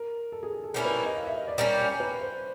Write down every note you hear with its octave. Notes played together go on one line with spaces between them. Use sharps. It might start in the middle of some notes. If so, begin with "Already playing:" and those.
Already playing: A#4
A4
G#4
G#4
A4
G3 A#3 C#4 E4 A#4
B4
C#5
D#5
F5
E5
D#5
D5
G3 A#3 C#4 C#5
C#5
B4
C5